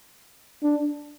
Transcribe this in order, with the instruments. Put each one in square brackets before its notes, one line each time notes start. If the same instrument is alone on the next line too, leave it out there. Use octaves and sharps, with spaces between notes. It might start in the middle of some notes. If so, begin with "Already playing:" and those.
[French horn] D4